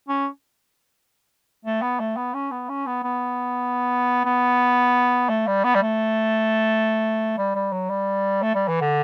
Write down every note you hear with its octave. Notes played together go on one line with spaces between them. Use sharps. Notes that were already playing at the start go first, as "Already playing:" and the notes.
C#4
A3
B3
A3
B3
C#4
B3
C#4
B3
B3
B3
A3
G3
B3
G3
A3
G3
G3
F#3
G3
A3
G3
E3
D3